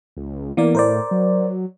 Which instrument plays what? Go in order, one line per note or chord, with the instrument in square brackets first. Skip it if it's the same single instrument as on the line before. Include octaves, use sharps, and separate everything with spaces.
[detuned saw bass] C#2
[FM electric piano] E3 B3 D5 [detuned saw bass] A#3
[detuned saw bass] A2 [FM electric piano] A#4 C5 D5
[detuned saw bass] F#3